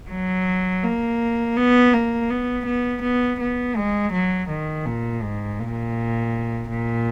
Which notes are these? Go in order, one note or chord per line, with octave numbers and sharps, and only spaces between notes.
F#3
A#3
B3
A#3
B3
B3
B3
B3
G#3
F#3
D#3
A#2
G#2
A#2
A#2